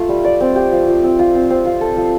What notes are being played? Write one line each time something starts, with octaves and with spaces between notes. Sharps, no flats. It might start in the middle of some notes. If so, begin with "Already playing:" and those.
Already playing: A3 F4
G3
D5
C4
G4
F3
F3
C4
F4
C4
C4
F4
A4
F3